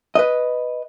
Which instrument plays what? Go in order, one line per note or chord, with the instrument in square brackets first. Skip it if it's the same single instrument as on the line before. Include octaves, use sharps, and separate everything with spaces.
[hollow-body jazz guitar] B4 D#5